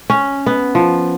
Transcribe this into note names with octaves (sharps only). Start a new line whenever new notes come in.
C#4
B3
F3